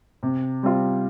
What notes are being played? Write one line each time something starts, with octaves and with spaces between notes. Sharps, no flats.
C3
G3 C4 F4